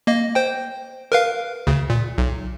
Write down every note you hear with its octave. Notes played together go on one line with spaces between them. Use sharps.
A#3 D#5
C5 G5
A#4 B4 F5
D2 C#3
A#2
B1